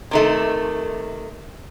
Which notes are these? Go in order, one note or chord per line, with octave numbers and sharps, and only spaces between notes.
C3 D#3 A3